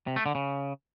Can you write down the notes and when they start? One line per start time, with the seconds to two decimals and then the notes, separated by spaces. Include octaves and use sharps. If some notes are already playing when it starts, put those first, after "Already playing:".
0.07 C3
0.16 A3
0.26 D3
0.35 C#3